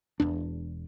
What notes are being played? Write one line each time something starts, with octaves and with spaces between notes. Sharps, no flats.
E1 E2 D4